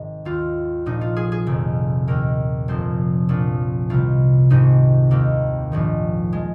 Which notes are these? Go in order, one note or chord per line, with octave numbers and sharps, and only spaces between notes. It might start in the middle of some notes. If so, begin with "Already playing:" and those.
Already playing: G#1 G#2 D#3
D#2 D#3 F4
A#1 A#2 F3 D#4
F4
G#4
G#4
F1 F2 D#3
D#2 D#3 A#4
F1 F2 F3 C5
A#1 A#2 F3
C2 C3 D#3 F4
G#1 G#2 D#3 D#4
D#2 D#3 A#3
A#1 G#2 D#3
F3 G#3